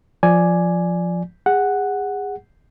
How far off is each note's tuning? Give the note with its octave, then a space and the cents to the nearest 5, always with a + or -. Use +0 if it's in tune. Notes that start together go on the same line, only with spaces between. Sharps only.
F3 +0 D5 +0 G#5 +5
G#4 -30 F#5 +0